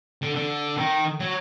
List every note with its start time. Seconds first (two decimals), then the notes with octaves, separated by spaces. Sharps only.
0.22 D3
0.36 D3
0.77 D#3
1.20 F#3